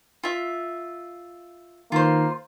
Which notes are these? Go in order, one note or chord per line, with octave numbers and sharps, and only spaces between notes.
F4 E5
D#3 A#3 F4 C5